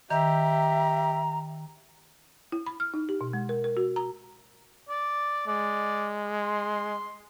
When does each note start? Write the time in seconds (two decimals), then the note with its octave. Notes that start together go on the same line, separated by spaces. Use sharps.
0.11 D#3 G4 E5 A#5
2.52 E4
2.66 B5
2.80 F6
2.94 D#4
3.09 G4
3.21 B2
3.33 G#3
3.49 A#4
3.64 A#4
3.77 F#4
3.96 A#5
4.89 D5
5.47 G#3 D5
6.42 C6